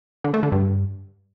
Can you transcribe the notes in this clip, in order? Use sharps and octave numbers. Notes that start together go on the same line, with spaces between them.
D3
A3
D3
G2